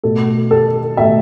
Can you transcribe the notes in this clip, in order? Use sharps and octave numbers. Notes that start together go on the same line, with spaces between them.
B2 A3 A4
A4
B2 A3 E5